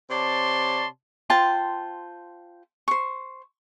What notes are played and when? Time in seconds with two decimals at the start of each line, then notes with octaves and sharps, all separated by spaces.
0.10 C3 C#5 D5 A5 C6
1.30 F4 C5 G5 A5
2.88 C5 C#6